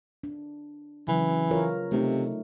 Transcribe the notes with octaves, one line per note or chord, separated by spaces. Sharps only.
D4
C#3 E3 F#3 B4
F4 A#4 C#5
C3 A3 D#4